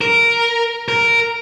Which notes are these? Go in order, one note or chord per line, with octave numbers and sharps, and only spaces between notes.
A#4
A#4